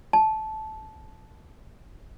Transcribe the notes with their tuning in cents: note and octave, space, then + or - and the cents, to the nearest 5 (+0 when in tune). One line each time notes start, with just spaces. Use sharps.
A5 -15